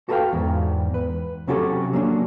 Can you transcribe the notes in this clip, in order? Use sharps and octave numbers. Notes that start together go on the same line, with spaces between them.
F#4 A4 B4 D5 F5 G5
E2 G#2
B4
C3 F#3 C#4 F#4 G4 A4
F#3 A#3 C#4 D4